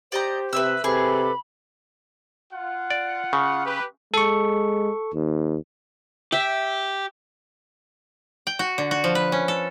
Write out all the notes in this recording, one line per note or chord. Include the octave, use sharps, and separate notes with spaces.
G4 C5 D5 D#5 A#5
C3 B4 E5 E6
C3 G#4 A4 B4 B5 D6
F4 F#5
D5
C#3
G4 B4
G#3 A4 C#6
D#2
G4 E5 G5
G5
F#4
D3
F#4
F3
B4
C#4
A4